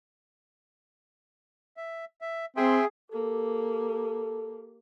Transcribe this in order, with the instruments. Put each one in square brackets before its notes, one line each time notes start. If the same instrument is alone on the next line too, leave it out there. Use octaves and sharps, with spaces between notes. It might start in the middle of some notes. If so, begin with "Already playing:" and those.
[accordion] E5
E5
[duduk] C4 [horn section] G#4 [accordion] E5 G5 C6
[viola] A#3 G4 [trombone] A4